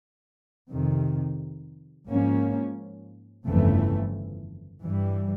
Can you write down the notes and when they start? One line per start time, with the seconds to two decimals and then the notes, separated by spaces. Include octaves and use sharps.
0.70 F2 C3 D#3
2.09 G#2 F3 A#3 C#4
3.46 G1 F2 C#3 E3 A3
4.84 G2 E3 G3